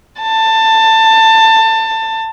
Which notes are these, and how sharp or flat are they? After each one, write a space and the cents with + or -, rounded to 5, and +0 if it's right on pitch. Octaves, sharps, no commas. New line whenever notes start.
A5 +20